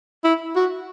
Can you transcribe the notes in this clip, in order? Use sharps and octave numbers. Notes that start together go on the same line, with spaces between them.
E4
F#4